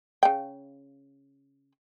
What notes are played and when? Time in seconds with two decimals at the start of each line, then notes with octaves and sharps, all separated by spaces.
0.23 C#3 G5